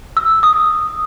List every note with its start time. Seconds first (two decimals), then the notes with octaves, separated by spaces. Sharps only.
0.17 E6
0.43 D#6